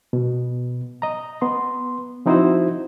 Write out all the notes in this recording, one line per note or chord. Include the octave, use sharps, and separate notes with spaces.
B2
D#5 A#5
B3 C6
F3 C4 D#4 E4 F#4 C5